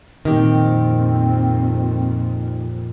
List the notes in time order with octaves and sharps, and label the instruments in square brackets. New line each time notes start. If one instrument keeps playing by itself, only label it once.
[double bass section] F2 A#2 [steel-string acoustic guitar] D#3 G4 [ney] C4